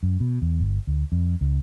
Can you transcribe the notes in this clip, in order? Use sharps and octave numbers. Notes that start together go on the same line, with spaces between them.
F#2
B2
E2
G1
D2
F2
C#2